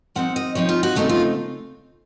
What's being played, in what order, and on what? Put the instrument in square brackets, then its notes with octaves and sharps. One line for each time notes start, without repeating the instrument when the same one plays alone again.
[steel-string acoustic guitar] F3 C4 D#4 F#5
D#5
F3 C4 D#4 C#5
F4
F#4
C#3 A3 C4 D#4 A4
F4